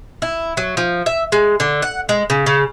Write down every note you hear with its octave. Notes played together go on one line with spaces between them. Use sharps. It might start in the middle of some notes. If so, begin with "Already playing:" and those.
E4
F#3
F3
E5
G#3
D3
F#5
G#3
C#3
C#3